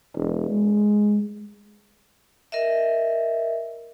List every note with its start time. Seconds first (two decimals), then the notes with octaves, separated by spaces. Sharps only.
0.16 E1
0.49 G#3
2.52 A#4 D#5 E5